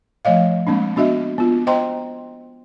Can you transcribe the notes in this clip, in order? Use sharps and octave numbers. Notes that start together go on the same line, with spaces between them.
F3 A3 C#5 D#5 F5
G#3 A#3 C4 D4
B3 D4 F#4 D#5 E5
B3 F4
C5 D#5 G5 A#5 C6